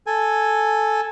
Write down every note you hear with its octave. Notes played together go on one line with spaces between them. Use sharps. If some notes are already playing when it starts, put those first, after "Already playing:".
A4 G#5